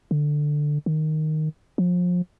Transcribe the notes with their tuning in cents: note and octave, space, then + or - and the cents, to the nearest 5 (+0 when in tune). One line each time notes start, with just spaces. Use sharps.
D3 +10
D#3 -5
F3 +30